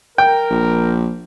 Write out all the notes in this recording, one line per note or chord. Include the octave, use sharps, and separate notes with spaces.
A#4 G5
A#1